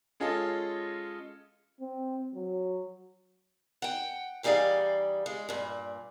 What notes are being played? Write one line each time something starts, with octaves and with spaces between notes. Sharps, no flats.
G#3 C#4 F4 A4 D#5
C4
F#3
F#5 G5
E3 G3 D#4 G#4 D5 F5
G#3
G2 A#2